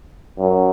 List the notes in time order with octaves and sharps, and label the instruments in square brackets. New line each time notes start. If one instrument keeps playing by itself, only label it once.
[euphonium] F#2